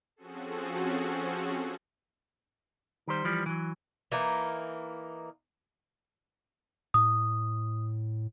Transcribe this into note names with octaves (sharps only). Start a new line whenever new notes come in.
F3 C4 C#4 F#4 G#4 A4
D#3 G3 C5
E3 F3 G3
E3 F#3
E3 A#3 D#4
A2 D#6